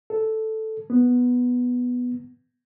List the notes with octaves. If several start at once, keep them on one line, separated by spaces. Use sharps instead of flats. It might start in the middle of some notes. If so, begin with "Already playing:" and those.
A4
B3